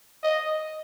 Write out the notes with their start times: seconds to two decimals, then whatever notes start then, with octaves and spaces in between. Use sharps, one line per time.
0.23 D#5